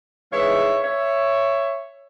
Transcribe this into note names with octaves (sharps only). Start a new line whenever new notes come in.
G#2 E3 G#3 C#5 E5
C#5 E5